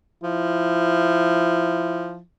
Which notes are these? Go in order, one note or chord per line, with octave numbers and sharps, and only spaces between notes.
F3 E4